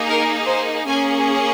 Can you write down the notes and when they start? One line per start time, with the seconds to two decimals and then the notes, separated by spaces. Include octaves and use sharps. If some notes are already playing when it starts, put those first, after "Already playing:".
Already playing: A#3 D#4 G#4
0.08 A#4
0.47 C5
0.87 A#3 C#4 G#4 G#5